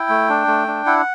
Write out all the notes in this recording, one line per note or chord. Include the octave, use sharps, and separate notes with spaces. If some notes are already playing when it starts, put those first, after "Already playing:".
Already playing: E4 G5
A3
D4
A3
D4
E4 F#5